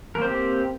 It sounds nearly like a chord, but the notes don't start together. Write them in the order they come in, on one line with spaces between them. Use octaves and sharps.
A#4 A#3 C5 C4 G4